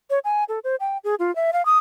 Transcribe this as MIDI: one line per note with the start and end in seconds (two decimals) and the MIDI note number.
0.10 0.19 73
0.25 0.44 80
0.49 0.59 69
0.64 0.76 72
0.80 0.98 79
1.04 1.15 68
1.19 1.34 65
1.36 1.51 76
1.53 1.64 77
1.66 1.78 87